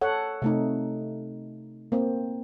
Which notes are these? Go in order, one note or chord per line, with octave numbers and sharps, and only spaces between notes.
A4 C#5 F#5
C3 A3 D#4
A#3 C4